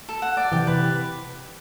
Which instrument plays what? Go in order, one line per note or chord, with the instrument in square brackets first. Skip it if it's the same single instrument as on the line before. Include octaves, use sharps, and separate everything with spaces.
[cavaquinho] A4
F#5
D5
[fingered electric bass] C3 E3 [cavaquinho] G4
[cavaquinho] B4